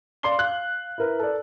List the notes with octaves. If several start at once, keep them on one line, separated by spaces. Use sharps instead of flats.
D5 F5 C6 D6 C7 G7
F5 F#6
E4 A#4 B4
A4 D5